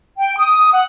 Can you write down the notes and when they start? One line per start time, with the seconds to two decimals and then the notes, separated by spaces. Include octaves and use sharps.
0.17 G5
0.38 D#6
0.73 F#5